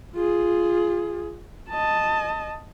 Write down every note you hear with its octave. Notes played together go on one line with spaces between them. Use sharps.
F4 G#4
D#5 A5